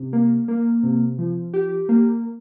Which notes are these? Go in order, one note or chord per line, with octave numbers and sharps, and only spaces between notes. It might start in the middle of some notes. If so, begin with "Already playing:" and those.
Already playing: C3
A#3
A#3
C3
F3
G4
A#3